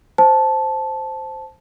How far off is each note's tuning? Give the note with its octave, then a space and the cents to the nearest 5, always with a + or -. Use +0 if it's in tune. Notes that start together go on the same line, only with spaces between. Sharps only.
C5 +0 A5 -10